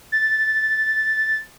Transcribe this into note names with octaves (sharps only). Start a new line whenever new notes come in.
A6